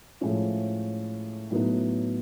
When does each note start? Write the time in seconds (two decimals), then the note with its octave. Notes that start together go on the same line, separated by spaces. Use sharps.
0.21 A2 F3 G#3 C#4 E4
1.51 A2 F#3 B3 D#4